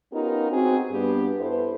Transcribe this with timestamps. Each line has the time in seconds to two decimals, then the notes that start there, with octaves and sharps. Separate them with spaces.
0.13 B3 C#4 D#4 F4 G4 A#4
0.51 C4 F#4 G#4
0.91 G2 B3 G4
1.40 E4 A4 B4 C5